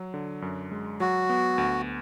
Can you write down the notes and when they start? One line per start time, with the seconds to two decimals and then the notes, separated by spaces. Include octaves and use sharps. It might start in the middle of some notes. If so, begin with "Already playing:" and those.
Already playing: F#3
0.14 D3
0.42 F#2
0.71 G#3
1.00 F#3 F#4
1.29 B3
1.58 D2